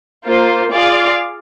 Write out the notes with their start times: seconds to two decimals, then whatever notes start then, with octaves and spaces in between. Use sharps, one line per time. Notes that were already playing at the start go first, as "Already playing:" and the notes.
0.27 A#3 F4 C5
0.73 F4 G#4 D5 F5